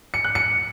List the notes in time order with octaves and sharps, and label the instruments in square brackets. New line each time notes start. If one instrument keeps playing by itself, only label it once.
[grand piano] C#7
F#6
C#7